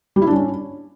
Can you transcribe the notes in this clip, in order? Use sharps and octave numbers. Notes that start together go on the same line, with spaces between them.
G3
E4
D4
C#4